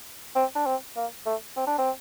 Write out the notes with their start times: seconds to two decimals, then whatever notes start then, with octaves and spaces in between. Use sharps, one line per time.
0.35 C4
0.56 D4
0.66 C4
0.97 A#3
1.26 A3
1.57 C4
1.67 D4
1.78 C4